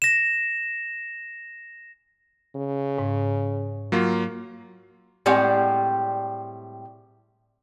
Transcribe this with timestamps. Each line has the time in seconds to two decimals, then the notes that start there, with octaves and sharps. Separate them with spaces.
0.02 A#6 E7
2.56 C#3
2.99 G#2
3.92 F#3 A#3 F4
5.26 A2 G3 G#3 C4 D5 F#5